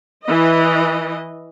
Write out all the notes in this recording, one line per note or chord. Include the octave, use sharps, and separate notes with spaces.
E3 D#5